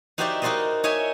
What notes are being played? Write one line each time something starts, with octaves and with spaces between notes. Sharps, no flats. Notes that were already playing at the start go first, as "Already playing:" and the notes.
D#4 F#4 G4 C5 D5 E5
D#4 F#4 A#4 C5 D5 D#5
D#4 C#5 D#5 E5 G#5